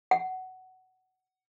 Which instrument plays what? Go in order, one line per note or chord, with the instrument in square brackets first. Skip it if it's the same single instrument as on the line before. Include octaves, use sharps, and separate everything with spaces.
[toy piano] F#5